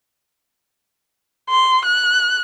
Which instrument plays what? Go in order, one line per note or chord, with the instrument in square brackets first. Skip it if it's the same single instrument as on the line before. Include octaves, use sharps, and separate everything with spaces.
[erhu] C6
F#6